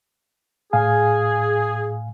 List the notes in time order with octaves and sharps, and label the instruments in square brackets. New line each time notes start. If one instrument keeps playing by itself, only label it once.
[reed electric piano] A2 F5 G#5 [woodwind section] G#4